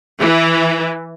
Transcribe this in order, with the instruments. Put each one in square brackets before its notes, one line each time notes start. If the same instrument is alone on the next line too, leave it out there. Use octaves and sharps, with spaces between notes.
[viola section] E3